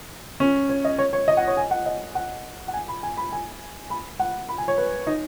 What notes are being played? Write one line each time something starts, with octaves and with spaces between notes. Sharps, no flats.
C#4
C#5
D#5
C#5
C#5
D#5
F#5
C#5
G#5
F#5
D#5
F#5
F#5
G#5
B5
G#5
B5
G#5
B5
F#5
B5
G#5
C#5
B4
D#4